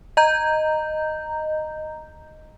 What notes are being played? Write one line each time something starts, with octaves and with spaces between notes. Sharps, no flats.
D#5 A#5 G6